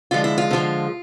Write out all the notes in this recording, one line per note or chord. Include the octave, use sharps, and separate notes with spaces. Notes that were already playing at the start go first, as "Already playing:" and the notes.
D3 F3 G#3 F4
E4
F4
D3 F3 G#3